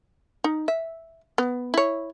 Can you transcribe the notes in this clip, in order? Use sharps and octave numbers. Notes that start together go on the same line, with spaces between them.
D#4
E5
B3
E4 C#5